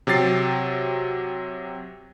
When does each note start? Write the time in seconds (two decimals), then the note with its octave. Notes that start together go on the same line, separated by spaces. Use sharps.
0.07 C3 F#3 G4 A6 C7